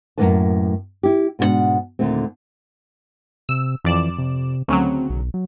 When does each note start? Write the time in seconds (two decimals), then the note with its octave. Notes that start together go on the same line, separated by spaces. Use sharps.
0.18 F#2 A2 G#3 A#3 B4 A5
1.03 E4 G4
1.39 G#2 B2 D4 F4 F#5
1.99 D#2 A#2 D3 A3 C4
3.49 C3 E6
3.85 F2 E3 D5 E7
4.18 C3
4.68 D2 C#3 F#3 C4
5.10 B1
5.34 F#3